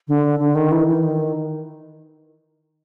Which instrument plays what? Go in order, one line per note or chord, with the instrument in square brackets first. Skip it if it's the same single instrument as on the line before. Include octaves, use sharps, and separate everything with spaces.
[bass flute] D3
D3
D#3
E3
E3
D#3